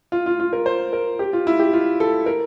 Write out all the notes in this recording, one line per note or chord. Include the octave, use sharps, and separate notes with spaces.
F4
F4
F4
A#4
C5
A#4
G4
F4
E4
G4
F4
A4
A#4